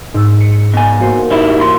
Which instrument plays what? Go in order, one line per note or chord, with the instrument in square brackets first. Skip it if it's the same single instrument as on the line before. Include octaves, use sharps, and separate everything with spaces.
[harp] G#2 E6
C#7
[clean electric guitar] B2 G#5
[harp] A#3 F#4 C5
[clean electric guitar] G3 D#4 E4
E3 C6